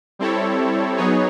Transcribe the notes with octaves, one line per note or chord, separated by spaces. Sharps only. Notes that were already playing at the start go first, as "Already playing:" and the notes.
G3 C4 E4 A4 C#5
F#3 B3 D#4 G#4 C#5